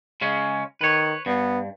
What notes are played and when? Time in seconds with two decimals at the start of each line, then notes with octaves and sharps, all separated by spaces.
0.21 C#3 G#3 C#4
0.81 D#3 B4 C#5
1.26 G2 B3